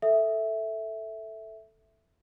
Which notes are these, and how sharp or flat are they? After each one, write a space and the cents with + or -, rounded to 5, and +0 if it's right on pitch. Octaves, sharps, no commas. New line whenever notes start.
A4 +0 E5 -5